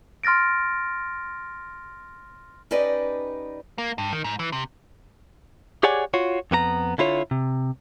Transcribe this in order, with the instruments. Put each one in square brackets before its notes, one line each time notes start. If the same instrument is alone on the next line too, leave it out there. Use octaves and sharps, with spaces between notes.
[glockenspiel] C6 F6 A6 A#6 D7
[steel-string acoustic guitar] C#4 D#4 G4 B4 D5 D#5
[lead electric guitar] A#3
G2
D#3
G#2
E3
C3
[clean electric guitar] G4 G#4 C#5 D5 F#5 G#5
F4 F#4 C#5
F2 B3 F#4 A#5
D3 E4 F4 C#5
C3